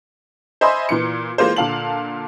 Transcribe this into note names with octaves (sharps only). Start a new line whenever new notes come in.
C5 D#5 E5 G#5 B5 C6
A#2 E3 C#7
E3 G#3 A#3 F4 C5
A#2 D3 F5 A5 F#7